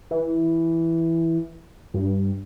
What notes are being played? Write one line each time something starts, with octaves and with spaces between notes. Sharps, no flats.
E3
G2